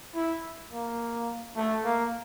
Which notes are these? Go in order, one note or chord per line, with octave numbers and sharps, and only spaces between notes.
E4
A#3
A3
A#3